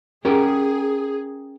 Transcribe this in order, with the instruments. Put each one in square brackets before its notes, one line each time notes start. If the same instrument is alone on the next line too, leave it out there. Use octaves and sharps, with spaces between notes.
[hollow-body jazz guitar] C#4 G4 A#4 [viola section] G#4